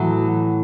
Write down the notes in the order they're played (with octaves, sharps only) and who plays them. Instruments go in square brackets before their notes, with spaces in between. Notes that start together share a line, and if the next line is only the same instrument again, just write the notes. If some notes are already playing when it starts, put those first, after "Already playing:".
Already playing: [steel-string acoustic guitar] A2 E3 F#3